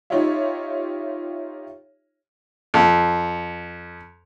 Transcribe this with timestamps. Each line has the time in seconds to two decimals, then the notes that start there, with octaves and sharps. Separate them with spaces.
0.10 D#4 F4 G4 C#5 E5
2.74 F2